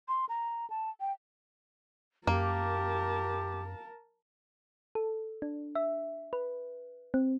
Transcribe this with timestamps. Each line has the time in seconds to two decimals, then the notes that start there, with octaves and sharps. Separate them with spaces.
0.08 C6
0.29 A#5
0.70 A5
1.00 G5
2.27 F#2 A#3 G4 A#4 A5
4.95 A4
5.42 D4
5.75 E5
6.33 B4
7.14 C4